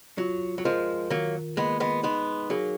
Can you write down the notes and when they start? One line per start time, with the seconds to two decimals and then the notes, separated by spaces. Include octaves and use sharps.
0.18 F#3 F4
0.58 F#3
0.65 F3 G#3 A#4
1.10 D#3 F#3 A#3
1.57 G#3 A#3 B3
1.80 G#3 B3
2.03 G#3 B3 D#4
2.50 F#3 A#3 G#4